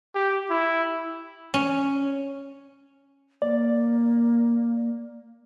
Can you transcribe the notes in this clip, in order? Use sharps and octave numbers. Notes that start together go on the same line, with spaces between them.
G4
E4
C#4
A#3 D5